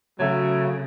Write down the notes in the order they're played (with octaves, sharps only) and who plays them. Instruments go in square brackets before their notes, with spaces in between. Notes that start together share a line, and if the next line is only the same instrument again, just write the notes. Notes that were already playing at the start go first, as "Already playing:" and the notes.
[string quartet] C#3 [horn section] F#3 A3